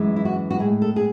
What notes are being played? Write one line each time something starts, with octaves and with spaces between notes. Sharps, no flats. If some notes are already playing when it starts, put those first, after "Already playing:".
Already playing: F#2 E3 G#3
E4
F#4
F#4
A2 G#3 G#4
A4
G#4